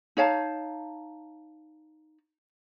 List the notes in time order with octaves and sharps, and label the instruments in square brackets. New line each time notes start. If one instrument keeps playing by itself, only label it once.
[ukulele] D#4 C#5 F5 A5